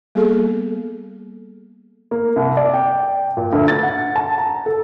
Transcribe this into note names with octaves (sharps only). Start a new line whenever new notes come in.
G3 A#3 B3 G#4 A4
A#3
C2
D5
G5
A#2
D2
A6
F#5
A5
A#5
A4